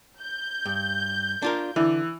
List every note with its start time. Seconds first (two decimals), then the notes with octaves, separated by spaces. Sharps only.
0.21 G6
0.66 G2
1.42 D4 F4 A#4
1.76 D3 E3